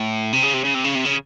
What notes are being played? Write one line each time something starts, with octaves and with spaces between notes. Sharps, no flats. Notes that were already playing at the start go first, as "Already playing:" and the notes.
Already playing: A2
C3
C#3
C3
C#3
C3
C#3
C3
C#3